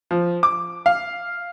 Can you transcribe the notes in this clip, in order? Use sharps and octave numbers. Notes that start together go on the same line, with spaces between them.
F3
D6
F5